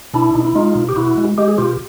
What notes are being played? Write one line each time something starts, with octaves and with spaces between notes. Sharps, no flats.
B2 D4 E4
B2 D#4
E4
G#3 D#4 F4
B2
G4
B2 E4 F#4
G#3
G#3 G4
G#4
B2 F4 G4